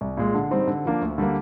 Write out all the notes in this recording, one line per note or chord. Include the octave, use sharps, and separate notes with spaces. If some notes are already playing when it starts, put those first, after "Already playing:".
C2
A#2 G#3
D3
G3 C4 D#4
D3
F3 A#3 D4
D2
D3 G3 A#3